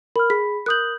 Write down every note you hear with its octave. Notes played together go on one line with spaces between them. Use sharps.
A#4 B5 F6
G#4 B5 B6
A#4 D#6 F#6 G6 F#7